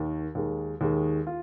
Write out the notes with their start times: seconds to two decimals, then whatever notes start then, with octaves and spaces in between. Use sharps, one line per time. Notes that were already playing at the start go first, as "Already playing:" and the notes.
Already playing: D#2 D#3
0.35 D#2 D#3 G#3
0.81 D#2 D#3 G#3
1.27 F4